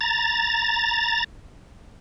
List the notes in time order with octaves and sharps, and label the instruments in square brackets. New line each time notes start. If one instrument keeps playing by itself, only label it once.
[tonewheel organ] A#5 A6